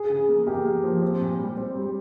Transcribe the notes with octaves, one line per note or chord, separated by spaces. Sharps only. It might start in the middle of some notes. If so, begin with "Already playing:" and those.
Already playing: G#4
C#3
A#3
A#3 G4
A#3
F3
C4
A#2
G3
C4 G4
G3